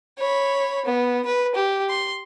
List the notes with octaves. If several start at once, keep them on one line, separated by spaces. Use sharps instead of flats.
C#5 B5
B3
B4
G4
C6